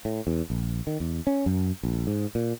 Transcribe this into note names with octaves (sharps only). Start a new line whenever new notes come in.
A2
E2
A#1
D#3
E2
C#4
F#2
A#1
G#2
A#2